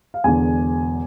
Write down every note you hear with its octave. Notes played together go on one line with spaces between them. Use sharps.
F5
E1 E2 D3 G#5